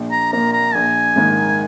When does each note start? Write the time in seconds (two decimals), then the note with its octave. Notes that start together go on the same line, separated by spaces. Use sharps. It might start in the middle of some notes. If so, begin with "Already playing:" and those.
Already playing: A#1
0.11 A#5
0.32 A#2 A#3 A#5
0.53 A#5
0.74 A#1 G#5
1.16 G#2 D#3 A#3